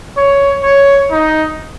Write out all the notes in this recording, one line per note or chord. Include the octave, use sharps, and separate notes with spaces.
C#5
C#5
D#4